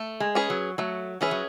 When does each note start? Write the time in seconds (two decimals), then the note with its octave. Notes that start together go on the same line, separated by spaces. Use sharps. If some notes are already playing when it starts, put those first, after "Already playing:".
Already playing: A3
0.20 G#3
0.35 C#4 G#4 B4
0.50 F#3
0.78 F#3 A3
1.21 E3 C#4 G#4 B4
1.31 F#3